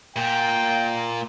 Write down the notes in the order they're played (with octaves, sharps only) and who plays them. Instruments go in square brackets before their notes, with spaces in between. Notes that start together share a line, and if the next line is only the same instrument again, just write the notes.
[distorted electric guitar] A#2 [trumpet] G5